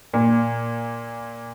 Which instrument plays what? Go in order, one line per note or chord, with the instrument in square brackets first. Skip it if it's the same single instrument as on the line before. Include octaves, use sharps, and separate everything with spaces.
[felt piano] A#2